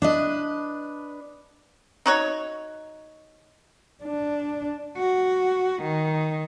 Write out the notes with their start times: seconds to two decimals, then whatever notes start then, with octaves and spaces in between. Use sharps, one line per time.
0.02 D4 B4 D#5
2.06 D#4 F#4 C#5
4.04 D4
4.97 F#4
5.83 D#3